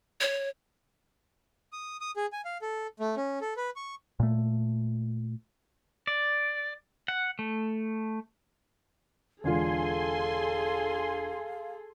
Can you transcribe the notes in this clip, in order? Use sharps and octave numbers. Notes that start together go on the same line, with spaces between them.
C#5
D#6
D#6
G#4
G#5
F5
A4
A3
C#4
A4
B4
C#6
A#2 A3
D5
F#5
A3
E1 D3 F4 G#4 A4 F5 G#5 C6